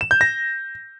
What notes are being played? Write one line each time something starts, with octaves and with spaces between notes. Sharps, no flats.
E7
G6
A#6